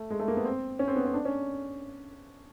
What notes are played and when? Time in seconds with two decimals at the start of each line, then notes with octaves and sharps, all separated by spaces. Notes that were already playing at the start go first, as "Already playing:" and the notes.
Already playing: A3
0.10 G#3
0.19 A3
0.28 A#3
0.37 B3
0.45 C4
0.79 C#4
0.88 C4
0.96 B3
1.05 C4
1.14 D4
1.25 C#4